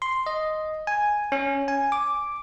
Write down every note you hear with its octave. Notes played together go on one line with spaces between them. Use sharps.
C6
D#5
G#5
C#4
G#5
D6